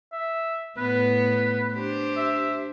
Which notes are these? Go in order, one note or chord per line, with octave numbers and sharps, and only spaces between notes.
E5
A2 B3 B4
D4 G4 C5
E5